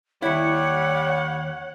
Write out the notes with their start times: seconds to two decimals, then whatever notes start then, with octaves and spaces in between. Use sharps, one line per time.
0.22 D#2 G3 E4 C#5 F#5